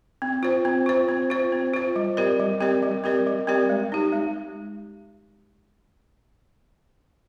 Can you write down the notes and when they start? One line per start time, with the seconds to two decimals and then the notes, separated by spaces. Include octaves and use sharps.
0.22 C4
0.43 F4 C5
0.65 C4
0.86 F4 C5
1.08 C4
1.30 F4 C5
1.52 C4
1.74 F4 C5
1.96 G3
2.17 C4 G4 A#4 D5
2.39 G3
2.61 C4 G4 A#4 D5
2.82 G3
3.04 C4 G4 A#4 D5
3.27 G3
3.47 C4 G4 A#4 D5
3.69 G#3
3.92 D#4 G4
4.13 G#3